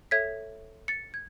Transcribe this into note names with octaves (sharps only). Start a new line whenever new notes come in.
A4 C#5 E5 G#6 B6
A6 C#7
G#6